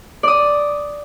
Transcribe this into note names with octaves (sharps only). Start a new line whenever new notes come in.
D5 D#6